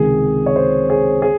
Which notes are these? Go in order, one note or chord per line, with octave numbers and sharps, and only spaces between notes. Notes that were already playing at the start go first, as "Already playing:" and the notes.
Already playing: C#2 C3 D#3 G#4
C#5
C5
G#4
G#4